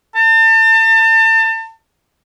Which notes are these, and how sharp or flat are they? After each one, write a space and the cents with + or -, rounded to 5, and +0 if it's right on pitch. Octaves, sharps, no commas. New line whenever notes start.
A5 +35